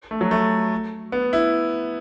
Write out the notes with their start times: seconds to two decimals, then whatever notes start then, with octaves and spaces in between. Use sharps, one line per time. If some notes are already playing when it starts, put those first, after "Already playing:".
0.11 A3
0.21 F#3
0.31 A3
1.12 B3
1.33 E4